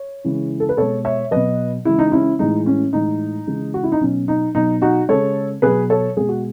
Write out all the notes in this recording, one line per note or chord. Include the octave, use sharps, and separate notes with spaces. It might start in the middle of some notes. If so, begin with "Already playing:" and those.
Already playing: C#5
C#3 E3 G#3
A4
B4
B2 G#3 A4 C#5
C#5 E5
B2 F#3 B4 D#5
C#3 E3 G#3 E4
D#4
C#4 E4
A2 E3 G#3 D#4
C#4
A2 E3 G#3 D#4
C#3 E3 G#3
F#4
E4
D#4
B2 F#3 C#4
D#4
B2 F#3 D#4
D#4 F#4
C#3 G#3 A4 C#5
B2 F#3 G#4 B4
A4 C#5
B2 G#3 G#4
F#4